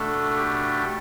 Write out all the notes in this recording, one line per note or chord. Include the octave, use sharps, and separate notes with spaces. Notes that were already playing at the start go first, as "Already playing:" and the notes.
Already playing: B2 A3 D4 A4
G4